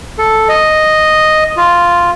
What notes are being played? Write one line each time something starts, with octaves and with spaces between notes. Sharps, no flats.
A4
D#5
F4